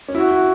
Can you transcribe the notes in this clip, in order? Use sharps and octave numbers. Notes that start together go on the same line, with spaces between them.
C#4
E4 F#4
E4